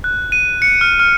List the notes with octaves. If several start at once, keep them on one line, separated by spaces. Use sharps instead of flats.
F#6
D#7
C#7
F6
F6